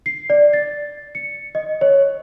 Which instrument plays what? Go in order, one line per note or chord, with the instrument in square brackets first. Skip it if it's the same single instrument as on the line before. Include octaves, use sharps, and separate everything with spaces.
[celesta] C7
D5
A6
C#7
D#5
C#5